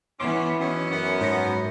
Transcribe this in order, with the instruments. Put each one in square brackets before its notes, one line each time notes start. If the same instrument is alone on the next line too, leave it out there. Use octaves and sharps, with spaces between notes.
[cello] E3 B3 [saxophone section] C#4 [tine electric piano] C6 D6
[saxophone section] D#3 F#3 B3 [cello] C#4
[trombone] F#2 [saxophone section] B3
[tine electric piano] G#2 F#3 A#6 [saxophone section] F3 B3